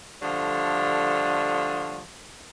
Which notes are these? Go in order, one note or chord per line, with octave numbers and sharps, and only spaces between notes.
D3 F3 G3 A3 C#5